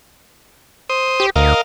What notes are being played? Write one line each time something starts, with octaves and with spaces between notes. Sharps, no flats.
C5 D#6
G4
D2 A#4 D#5 F5